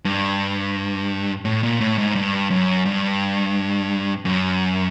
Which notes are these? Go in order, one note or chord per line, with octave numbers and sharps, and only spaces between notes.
G2
A2
A#2
A2
G#2
G2
F#2
G2
F#2